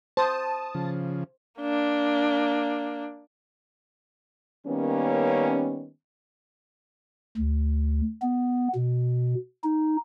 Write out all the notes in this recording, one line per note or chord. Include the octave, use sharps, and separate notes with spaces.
C5 A5 D#6
C#3 F3
A#3 D4
D#3 G3 A#3 B3 C#4
D2
B3
B2
D#4